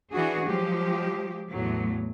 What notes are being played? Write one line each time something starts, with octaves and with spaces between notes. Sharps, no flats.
E3 D4 F#4 G#4
F3 F#3 G#3 G4
E2 A2 F#3